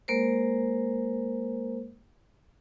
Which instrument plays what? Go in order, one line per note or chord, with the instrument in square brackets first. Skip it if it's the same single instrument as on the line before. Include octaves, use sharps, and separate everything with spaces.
[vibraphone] G#3 A#3 A#4 C5